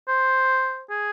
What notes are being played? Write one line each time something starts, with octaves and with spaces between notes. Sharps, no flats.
C5
G#4